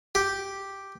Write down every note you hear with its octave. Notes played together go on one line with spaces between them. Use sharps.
G4